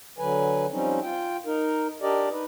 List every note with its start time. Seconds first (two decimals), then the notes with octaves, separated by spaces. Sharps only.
0.19 D3 F#3 B4 G#5
0.71 F3 G3 C4 C#4 D#4
1.03 F4 G5
1.46 D#4 A#4
2.02 D4 G4 A#4 D5 D#5
2.31 D#4 B4